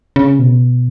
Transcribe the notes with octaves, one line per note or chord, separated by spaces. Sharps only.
C#3
B2